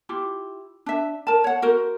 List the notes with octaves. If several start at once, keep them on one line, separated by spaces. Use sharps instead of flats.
E4 F4 G4
D4 E5
A#4 A5
C#5 F#5
F#4 A#4 C5